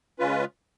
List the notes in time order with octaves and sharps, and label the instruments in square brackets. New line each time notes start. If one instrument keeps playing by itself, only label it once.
[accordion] C#3 G#3 C#4 F4 B4